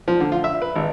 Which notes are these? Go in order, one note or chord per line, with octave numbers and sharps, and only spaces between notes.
F3
D3
F4
E5
B4
G#1